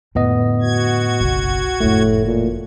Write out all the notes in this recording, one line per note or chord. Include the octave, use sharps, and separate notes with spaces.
F2 A2 D3 B3 D#5
F#4 G#6
F#1 B1
F#1 F2 A2 A3
A#2